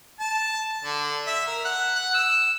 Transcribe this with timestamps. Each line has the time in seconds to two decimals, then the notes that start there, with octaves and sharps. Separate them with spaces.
0.20 A5
0.84 D3
1.27 E5
1.47 A#4
1.65 F#5
1.95 F#5
2.14 E6